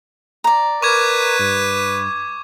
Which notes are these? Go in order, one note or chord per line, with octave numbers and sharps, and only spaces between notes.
D5 A#5
A#4 B4 C#6 D6 G#6
G2